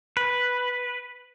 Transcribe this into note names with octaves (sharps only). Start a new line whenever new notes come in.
B4